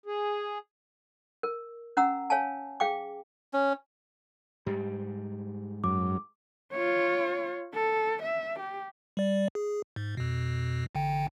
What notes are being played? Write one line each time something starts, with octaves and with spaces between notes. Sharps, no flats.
G#4
A#4
C#4 F#5 A#5 E6
C#5 F5 G#5 A5
G#4 F5 G5 D6
C#4
G#2 G3 G4
F#2 D6
F4 C#5
A4
E5
G4
G3 D5
G#4
G#2
F2 B2
A1 D3 G5